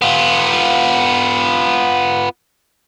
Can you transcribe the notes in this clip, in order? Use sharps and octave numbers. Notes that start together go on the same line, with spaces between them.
B3 F4